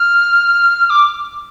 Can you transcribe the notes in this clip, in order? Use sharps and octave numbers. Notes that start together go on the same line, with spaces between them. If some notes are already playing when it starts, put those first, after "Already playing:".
Already playing: F6
D6